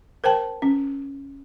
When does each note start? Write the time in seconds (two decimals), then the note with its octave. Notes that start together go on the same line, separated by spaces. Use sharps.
0.24 A#4 C5 G5 A5
0.62 C#4